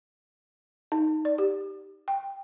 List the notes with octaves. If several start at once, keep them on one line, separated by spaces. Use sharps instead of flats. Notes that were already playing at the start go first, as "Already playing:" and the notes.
D#4
D5
G4
G5